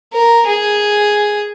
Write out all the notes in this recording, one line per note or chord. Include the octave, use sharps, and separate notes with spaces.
A#4
G#4